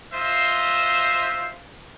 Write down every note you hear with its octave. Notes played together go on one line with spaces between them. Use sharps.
F4 C5 D#5 E5